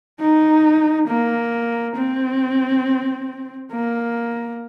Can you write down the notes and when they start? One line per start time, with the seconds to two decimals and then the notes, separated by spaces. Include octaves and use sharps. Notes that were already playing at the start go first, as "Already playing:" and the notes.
0.20 D#4
1.08 A#3
1.97 C4
3.72 A#3